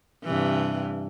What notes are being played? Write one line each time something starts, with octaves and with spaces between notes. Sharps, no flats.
G2 C3 E3